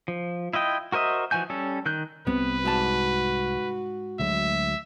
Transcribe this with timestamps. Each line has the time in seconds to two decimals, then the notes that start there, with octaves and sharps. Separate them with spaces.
0.08 F3
0.53 E4 F4 D#5 G5
0.92 F#4 A#4 C5 D#5 E5
1.31 E3 F3 F#4 G#5 G6
1.50 G3 C#4 A4
1.86 D#3 F#6 G6
2.27 C2 C3 B3 C4 B4
2.65 G#2 F#4 A5
4.20 D2 F#3 G#3 E5